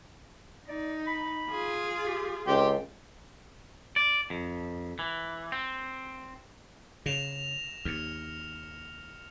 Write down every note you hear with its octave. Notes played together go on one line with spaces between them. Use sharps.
D#4 D5
B5
F4 G#4
G4
C#2 G4 A4 G5 C6
D5
F2
E3
C4
C#3 A#6 E7 F7
D#2 F6 C#7